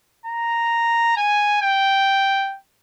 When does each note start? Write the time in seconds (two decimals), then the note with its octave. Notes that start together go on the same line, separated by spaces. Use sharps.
0.26 A#5
1.17 G#5
1.62 G5